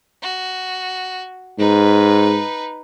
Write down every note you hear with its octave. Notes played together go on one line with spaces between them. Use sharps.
F#4
G#2 D#4 B4